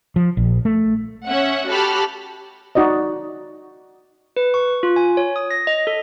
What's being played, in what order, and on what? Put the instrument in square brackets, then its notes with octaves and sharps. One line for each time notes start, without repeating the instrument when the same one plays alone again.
[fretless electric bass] F3
A#1
A3
[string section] C#4 E5 F#5
F#4 G4 A4 A5 B5 F6
[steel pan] D#4 F#4 D5 D#5
[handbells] B4
C#6
F4
G#5
C#5
D#6
A#6
D#5
A4